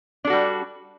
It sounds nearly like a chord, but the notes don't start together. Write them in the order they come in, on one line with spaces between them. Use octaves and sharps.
D4 A4 F#4 G3